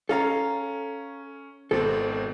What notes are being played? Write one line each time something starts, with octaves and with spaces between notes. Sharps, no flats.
C#4 A4 F5 A#5
G#1 B2 C4 A4